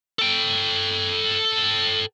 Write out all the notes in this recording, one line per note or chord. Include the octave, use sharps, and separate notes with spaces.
A4 G5